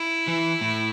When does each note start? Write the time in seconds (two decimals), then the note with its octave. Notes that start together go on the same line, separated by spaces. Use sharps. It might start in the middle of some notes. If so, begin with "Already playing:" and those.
Already playing: E4
0.28 E3
0.61 A2